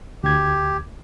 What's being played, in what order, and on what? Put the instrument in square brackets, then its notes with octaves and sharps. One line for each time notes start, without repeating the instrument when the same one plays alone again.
[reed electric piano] D2 G#6 [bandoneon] G4